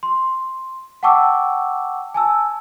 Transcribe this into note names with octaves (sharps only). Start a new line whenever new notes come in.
C6
F#5 G5 A5 C#6 D6 E6
G#5 A5 E6